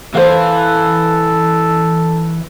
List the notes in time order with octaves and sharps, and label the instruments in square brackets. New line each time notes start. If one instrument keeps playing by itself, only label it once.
[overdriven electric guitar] E3 [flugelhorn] A4 [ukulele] C5 F5